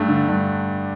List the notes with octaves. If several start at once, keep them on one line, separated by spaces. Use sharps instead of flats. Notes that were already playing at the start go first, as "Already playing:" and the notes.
Already playing: G2 A3
D3
G2